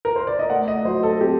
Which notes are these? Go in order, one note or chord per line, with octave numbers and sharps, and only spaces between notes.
A#4
C5
D5
D#5
A3 F#5
D#5
F#3 C5
A4
C4 G4